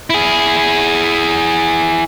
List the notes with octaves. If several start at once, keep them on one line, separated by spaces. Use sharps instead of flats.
E4 G#4